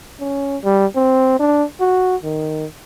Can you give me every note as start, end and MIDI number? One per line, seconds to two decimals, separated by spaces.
0.20 0.57 61
0.64 0.86 55
0.95 1.36 60
1.39 1.64 62
1.80 2.16 66
2.23 2.66 51